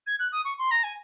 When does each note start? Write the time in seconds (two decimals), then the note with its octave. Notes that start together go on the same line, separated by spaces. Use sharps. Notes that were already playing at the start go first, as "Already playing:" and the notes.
0.06 G#6
0.19 F#6
0.32 D#6
0.44 C#6
0.58 C6
0.70 A#5
0.83 G#5